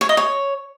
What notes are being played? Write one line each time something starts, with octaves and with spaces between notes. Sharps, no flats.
C#5
D#5
C#5